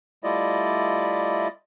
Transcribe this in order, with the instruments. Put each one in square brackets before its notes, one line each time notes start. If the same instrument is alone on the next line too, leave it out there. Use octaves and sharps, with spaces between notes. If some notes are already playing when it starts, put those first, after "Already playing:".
[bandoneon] G3 A3 E4 F4 D5 D#5